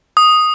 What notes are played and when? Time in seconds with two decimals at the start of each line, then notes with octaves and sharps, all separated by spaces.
0.17 D#6